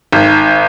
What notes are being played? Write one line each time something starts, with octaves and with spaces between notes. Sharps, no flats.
G#1